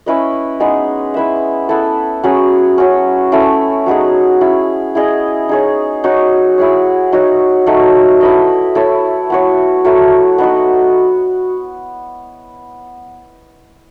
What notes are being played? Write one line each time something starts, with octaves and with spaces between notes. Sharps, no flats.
C#4 E4 B4 D#5
G#3 B3 D#4 G#4
E4 B4 E5
B3 E4 A4
F#3 C#4 G#4
C#4 F#4 C#5
A3 C#4 E4
F#3 B3 D#4 G#4
C#4 E4 G#4
E4 G#4 D#5
D#4 G#4 C#5
D#4 F#4 C#5
E4 G#4 C#5
D#4 F#4 C#5
F#3 A3 D#4
E4 B4 D#5
E4 A4 C#5
B3 F#4 C#5
F#3 A3 E4
B3 D#4 F#4